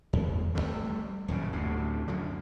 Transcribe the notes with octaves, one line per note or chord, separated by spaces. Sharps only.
E2
F1 G#2 G3 A3
D#1 F#2 A2 C#3
D2 A2 C3
F#2 D3 F3 F#3